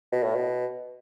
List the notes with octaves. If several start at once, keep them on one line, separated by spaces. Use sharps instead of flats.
B2
A2
B2